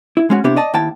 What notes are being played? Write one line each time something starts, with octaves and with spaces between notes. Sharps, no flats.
E4
G#3 C#4 F#4
C3 B3 D4 E4 G4
D5 D#5 A5
D#2 E4 G5 A5